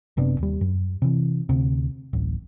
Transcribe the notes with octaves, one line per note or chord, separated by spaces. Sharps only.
F#1 C3 B3 D4
D#2 G3
F#2
C3 E3
D2 C3
D1 A1